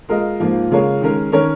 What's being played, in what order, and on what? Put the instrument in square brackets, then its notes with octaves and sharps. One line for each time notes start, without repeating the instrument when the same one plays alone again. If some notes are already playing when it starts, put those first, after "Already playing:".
[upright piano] G#3 F4 A#4 D#5
G#2 F3 A#3 F4
C#3 G#3 F4 A#4 C#5
D#3 G#3 C#4 A#4
D#3 C#4 A#4 C#5